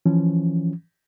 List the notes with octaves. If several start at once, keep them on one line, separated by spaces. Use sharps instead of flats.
E3 F3 C#4